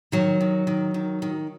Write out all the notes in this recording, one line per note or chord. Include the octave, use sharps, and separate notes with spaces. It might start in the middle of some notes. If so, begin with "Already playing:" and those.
D#3 F#3
D#3
D#3
D#3
D#3